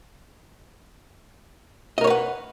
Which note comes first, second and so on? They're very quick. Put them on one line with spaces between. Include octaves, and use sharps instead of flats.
D#5 A#4 C#5 B4 F#5